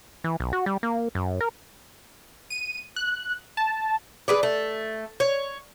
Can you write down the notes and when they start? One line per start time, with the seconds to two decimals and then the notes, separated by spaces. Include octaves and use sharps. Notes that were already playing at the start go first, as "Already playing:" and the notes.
0.24 E3
0.40 B1
0.53 F#4
0.66 G3
0.83 A#3
1.15 F#2
1.41 A#4
2.50 D#7
2.96 F#6
3.57 A5
4.28 G#4 B4 D5
4.43 A3
5.20 C#5